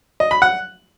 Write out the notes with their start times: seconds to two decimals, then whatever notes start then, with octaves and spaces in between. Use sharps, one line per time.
0.20 D#5
0.31 B5
0.42 F#5